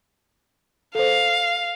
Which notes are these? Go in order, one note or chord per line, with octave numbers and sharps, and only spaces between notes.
A4 C5 F5